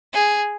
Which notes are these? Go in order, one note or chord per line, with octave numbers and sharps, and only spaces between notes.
G#4